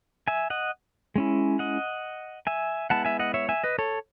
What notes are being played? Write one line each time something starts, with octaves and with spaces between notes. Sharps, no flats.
E5 G#5
D#5 F#5
G#3 C#4 E4
D#5 F#5
E5 G#5
G#3 B3 E4 F#5 A5
E5 G#5
D#5 F#5
C#5 E5
E5 G#5
B4 D#5
A4 C#5